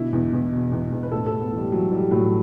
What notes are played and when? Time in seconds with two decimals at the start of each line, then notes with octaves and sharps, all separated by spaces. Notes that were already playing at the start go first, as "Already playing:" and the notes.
Already playing: B2 D3 E4
0.13 E2
0.33 E2
0.52 B2
0.72 E2
0.92 E2
1.03 B4
1.11 A2 A4
1.26 A4
1.32 A2
1.42 B3
1.52 E3 G3
1.72 E3 F#3
1.91 E3 G3
2.11 A2 F#3